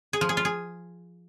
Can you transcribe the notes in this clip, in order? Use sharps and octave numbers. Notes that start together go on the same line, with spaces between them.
G#4
F3
G#4
F4
G#4